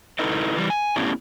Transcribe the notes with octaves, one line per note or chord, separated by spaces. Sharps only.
D#4 E4 A4 B4 D#5
E3 G3
G#5
A3 B3 C#4 D4 E4 G4